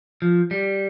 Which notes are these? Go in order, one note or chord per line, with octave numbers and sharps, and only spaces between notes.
F3
G3